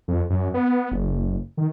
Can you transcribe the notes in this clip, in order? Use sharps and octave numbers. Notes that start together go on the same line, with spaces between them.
F2
F#2
B3
F#1
D#3